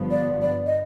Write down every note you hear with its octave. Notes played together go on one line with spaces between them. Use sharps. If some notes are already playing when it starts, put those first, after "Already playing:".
Already playing: G1 G2 F3 B3
D5
D5
D#5